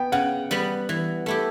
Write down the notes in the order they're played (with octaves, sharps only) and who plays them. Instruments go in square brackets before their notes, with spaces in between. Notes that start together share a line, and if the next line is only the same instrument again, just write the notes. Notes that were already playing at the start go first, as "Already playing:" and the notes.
Already playing: [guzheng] B3 [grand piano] G5
[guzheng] C#3 [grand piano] F#5
[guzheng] G3 B3
E3
A3 E4 G4